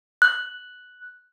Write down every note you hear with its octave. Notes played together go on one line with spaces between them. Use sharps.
F#6